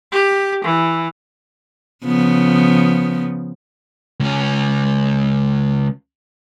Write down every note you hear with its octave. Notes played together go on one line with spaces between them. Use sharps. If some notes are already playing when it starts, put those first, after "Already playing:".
G4
E3
C#3 F3 B3
C#2 C#4